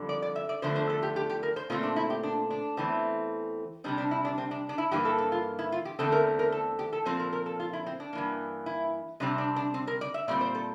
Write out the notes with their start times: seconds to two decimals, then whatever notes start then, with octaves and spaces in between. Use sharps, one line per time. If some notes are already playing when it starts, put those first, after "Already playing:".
Already playing: F2 D3 G3
0.09 D5
0.22 D5
0.36 E5
0.49 D5
0.62 E2 D3 F3 A3 C5
0.76 C5
0.90 A4
1.02 G4
1.16 G4
1.30 G4
1.43 A#4
1.56 C5
1.70 A#2 A3 C4 F4
1.83 D4
1.96 E4
2.10 G4
2.23 D4
2.50 D4
2.77 E2 E3 A3 C4
3.84 C3 G3 C4 D4
3.98 D4
4.11 E4
4.25 D4
4.38 C4
4.51 D4
4.69 D4
4.78 E4
4.91 G2 E3 A#3 G4
5.05 A4
5.18 A4
5.32 F4
5.59 E4
5.72 F4
5.85 G4
5.99 E2 D3 A3 C4 A4
6.12 A#4
6.39 A#4
6.52 A4
6.79 G4
6.93 A4
7.05 A#2 F3 C4 C5
7.19 A#4
7.32 A#4
7.46 A4
7.60 F4
7.73 E4
7.86 C4
8.00 D4
8.13 G2 E3 A#3
8.66 E4
9.20 C3 G3 C4 D4
9.38 D4
9.56 D4
9.74 C4
9.87 A#4
10.01 D5
10.14 E5
10.28 A#2 G3 C4 D5
10.41 C5
10.55 A4